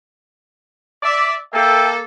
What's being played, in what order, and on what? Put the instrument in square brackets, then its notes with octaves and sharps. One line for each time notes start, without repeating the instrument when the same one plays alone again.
[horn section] D5 E5
[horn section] A#3 A4 [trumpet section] E5 G5